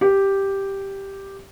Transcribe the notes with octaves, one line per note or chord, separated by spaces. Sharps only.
G4